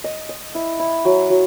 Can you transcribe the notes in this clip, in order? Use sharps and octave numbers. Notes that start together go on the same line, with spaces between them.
D#5
D#5
E4
E4
F#3
F#3